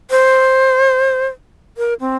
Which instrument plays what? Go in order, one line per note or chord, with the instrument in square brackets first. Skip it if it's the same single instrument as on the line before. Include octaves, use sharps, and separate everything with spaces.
[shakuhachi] C5
A#4
C4